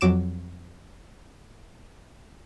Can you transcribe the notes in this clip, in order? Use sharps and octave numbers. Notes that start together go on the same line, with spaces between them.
F2 F#3 D6 D7 E7